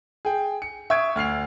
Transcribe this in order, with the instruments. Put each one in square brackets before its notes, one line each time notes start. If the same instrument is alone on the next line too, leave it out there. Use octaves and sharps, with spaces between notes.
[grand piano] G#4 G5
C#7
E5 C#6 D#6 G#6 D7
D2 F6 C7 F7